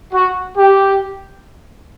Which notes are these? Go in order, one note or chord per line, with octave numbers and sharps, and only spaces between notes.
F#4
G4